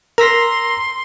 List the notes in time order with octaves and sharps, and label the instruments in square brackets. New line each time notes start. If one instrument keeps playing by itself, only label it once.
[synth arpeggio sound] A#4 B6 [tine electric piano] A#5 E6 A#6 [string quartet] C6